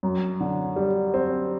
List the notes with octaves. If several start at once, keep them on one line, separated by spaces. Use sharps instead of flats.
F#2
D3
G3
C4